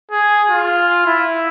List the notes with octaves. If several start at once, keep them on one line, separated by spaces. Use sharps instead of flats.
G#4
F4
E4